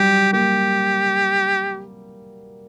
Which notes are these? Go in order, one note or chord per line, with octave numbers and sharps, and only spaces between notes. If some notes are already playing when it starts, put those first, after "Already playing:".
Already playing: F#3 G3 G4
A#3 G4